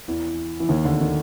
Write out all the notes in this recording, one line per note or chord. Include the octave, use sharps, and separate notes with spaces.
E2 E3
E3
D#2 D#3
D2 D3
D#3